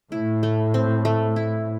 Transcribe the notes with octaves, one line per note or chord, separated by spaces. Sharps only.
A2 E4
A3
C4
A3
E4